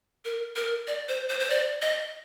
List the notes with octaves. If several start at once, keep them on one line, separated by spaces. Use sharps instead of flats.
A#4
A#4
D5
C5
C5
C5
D5
D#5